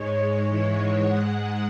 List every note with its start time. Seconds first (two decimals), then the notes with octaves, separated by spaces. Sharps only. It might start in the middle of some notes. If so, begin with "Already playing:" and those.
Already playing: G#2 G#3 C#5
0.47 G#2 E3 G#3
1.00 G#2 G#3 F#5